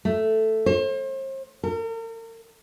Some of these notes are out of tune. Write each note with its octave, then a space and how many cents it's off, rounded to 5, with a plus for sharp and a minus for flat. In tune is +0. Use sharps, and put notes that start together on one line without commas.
A3 +0
C5 +40
A#4 -40